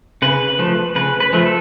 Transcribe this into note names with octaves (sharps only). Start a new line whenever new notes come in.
C#3 B4
F3 A3
C#3 B4
B4
F3 A3
A4